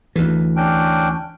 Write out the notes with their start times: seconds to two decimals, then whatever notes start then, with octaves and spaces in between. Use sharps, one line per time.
0.16 D2 E3
0.56 C#4 D4 G5